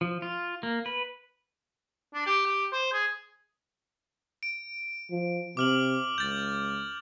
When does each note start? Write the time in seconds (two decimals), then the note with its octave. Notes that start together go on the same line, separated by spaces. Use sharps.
0.01 F3
0.22 F4
0.63 A#3
0.86 B4
2.14 D4
2.27 G4
2.46 G4
2.72 C5
2.93 G#4
4.43 D7
5.11 F3
5.57 C3 D6 F6 F#7
6.18 C#2 G6 A6